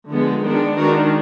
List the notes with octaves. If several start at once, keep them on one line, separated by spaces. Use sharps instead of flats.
D3 F3 G#3 B3
D#3 G#3 B3 D4
D#3 G#3 D4 F#4 A#4